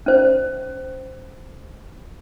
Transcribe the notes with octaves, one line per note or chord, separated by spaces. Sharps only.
C#4 C5